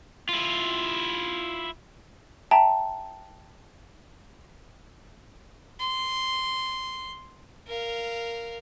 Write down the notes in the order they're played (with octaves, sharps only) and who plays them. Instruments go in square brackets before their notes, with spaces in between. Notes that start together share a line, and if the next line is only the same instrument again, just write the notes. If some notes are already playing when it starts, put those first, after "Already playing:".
[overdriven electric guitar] E4 F4
[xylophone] E5 G5 A5 A#5
[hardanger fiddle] C6
A#4 F5